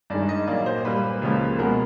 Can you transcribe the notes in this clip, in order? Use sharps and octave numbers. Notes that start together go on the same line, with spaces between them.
G2 D#3 G#3 D5
D#5
A#2 F#3 A#3 D5
C5
A#2 G3 A#3 B4
C#2 C#3 F3 A#3
B2 G#3 B3 A#4